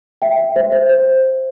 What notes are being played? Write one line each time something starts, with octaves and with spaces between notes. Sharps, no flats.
E5 G5
E5 G5
C5 E5
C5 E5
C5